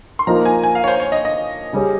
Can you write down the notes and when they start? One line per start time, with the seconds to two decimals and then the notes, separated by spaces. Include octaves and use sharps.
0.19 C6
0.27 F3 A#3 D#4 A#4 A#5
0.45 G#5
0.63 G#5
0.75 F5
0.84 C#5
0.88 C5
1.00 C#5
1.12 D#5
1.25 D#5
1.73 C#3 G3 C#4 G#4